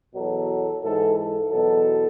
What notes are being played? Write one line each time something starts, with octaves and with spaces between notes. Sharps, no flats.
E2 B2 F#3 A4
G#2 E3 A4
A4
E2 B2 F#3 A4